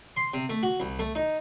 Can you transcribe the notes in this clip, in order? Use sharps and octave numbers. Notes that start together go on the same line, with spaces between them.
C6
C3
A3
F#4
C2
A3
D#4